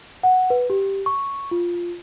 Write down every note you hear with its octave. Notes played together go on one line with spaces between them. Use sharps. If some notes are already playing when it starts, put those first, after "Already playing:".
F#5
B4
G4
C#6
F4